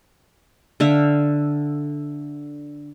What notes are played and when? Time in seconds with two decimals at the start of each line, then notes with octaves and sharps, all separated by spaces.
0.80 D3 E5 F5